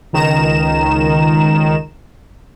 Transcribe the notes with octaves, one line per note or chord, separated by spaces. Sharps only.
C#2 D#3 A#5 E7